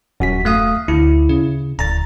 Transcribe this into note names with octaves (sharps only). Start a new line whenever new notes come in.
D#1 F#2 F#4 B6
A3 F5 D#6
D2 E4
C#3
D1 A#5 A6